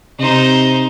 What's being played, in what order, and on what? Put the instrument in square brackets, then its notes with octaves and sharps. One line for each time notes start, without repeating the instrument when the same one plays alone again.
[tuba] C3 [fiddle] D#4 C5